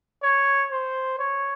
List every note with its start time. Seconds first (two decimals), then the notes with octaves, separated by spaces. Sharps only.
0.23 C#5
0.72 C5
1.19 C#5